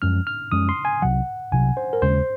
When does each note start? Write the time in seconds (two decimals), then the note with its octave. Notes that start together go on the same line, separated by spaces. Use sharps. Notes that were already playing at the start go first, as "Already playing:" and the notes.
0.02 F#2 F3 G#3 C#4 F6
0.27 F6
0.52 F#2 F3 G#3 C#4 D#6
0.69 C6
0.85 G#5
1.02 C2 C3 F#3 F#5
1.52 C2 C3 F#3 G#5
1.77 C5
1.93 A#4
2.02 D#2 C#3 G#3 C#4 C5